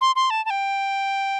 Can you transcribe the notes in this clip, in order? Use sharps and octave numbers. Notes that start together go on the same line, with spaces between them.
C6
C6
A5
A5
G5